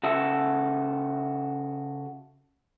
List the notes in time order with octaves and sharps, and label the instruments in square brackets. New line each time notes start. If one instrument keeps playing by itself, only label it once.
[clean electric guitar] C#3 F#4 A4 E5